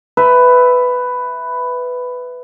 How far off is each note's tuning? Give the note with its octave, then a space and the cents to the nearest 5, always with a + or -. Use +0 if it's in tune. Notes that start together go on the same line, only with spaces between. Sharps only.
B4 +10 E5 +0